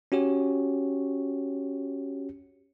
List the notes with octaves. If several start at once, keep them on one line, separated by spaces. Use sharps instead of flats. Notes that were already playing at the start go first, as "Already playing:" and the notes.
C#4 F#4 G4 C#5